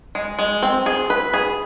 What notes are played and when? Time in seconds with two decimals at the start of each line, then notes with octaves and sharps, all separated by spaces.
0.15 G#3
0.39 G#3
0.63 C4
0.86 G#4
1.10 B4
1.34 G#4